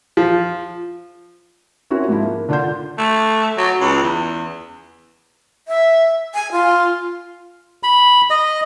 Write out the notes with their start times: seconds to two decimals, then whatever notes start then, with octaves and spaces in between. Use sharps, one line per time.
0.17 F3
1.91 C4 C#4 E4 F#4 A#4
2.09 G#2 F3 E4
2.23 A#3
2.49 D3 D4 F4 F#5 C6 G6
2.98 A3
3.57 F#3
3.80 C#2
4.03 E2
5.68 E5
6.34 G#5
6.52 F4
7.83 B5
8.30 D#5